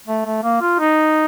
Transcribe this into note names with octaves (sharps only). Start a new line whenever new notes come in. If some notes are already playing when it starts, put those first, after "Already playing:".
A3
A3
A#3
F4
D#4